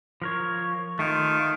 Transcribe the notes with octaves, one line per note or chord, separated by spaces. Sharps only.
F3 A#4 C#5
D#3 A3 F4